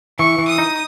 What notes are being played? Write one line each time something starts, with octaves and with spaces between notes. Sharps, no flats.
E3 C#6
E3
D#6
D#4